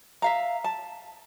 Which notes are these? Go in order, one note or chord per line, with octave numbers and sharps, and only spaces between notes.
E5 F5 A#5
A5